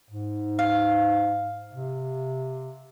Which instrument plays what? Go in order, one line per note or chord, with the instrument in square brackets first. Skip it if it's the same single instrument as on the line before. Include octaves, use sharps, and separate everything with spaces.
[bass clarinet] G#2
[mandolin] F5
[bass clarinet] C3